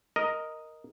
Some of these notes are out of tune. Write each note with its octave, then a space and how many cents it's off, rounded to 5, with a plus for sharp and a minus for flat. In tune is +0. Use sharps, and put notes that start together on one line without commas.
A#4 +0 D#5 +0